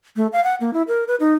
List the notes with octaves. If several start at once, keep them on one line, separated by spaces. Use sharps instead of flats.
A3
F5
F#5
A#3
E4
A#4
B4
D#4